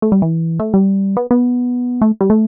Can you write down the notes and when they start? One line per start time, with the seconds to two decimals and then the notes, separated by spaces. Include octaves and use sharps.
0.02 A3
0.12 G3
0.22 E3
0.59 A3
0.74 G3
1.17 B3
1.31 B3
2.02 A3
2.21 G3
2.30 A3